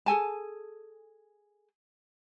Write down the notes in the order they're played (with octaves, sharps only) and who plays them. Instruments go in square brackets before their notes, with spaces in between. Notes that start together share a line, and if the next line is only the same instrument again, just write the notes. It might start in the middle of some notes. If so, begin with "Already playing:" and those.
[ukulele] G#4 A4 G#5 A5